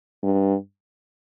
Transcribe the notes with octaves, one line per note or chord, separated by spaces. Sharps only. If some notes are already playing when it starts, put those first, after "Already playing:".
G2